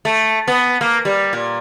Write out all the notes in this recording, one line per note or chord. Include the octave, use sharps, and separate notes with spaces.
A3
B3
A#3
G3
A#2